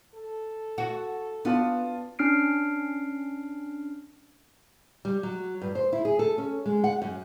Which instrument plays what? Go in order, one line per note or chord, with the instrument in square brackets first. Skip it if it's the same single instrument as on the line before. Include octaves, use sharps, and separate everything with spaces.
[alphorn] A4
[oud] F#4
[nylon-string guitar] B3 [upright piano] D4 F4 A5
[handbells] C#4 D4 F6 C7 D7
[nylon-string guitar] G3
F#3
G2
C5
E4
G#4
A4
C#4
G#3
F#5
F#2